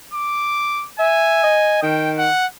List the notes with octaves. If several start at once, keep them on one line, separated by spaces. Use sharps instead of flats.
D6
E5 G#5
D#5
D#3 G5
F#5